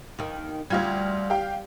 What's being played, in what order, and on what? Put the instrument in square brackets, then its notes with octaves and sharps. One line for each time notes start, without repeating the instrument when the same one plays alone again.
[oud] D#2 D#3
[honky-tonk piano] D2 F4 G#6 [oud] G3
[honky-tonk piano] G4 F5 G5